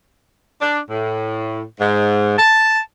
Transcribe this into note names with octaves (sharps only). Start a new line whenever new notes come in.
D4
A2
G#2
A5